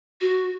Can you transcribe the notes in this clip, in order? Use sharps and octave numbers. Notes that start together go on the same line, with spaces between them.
F#4